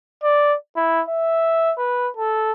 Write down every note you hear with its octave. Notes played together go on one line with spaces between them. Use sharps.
D5
E4
E5
B4
A4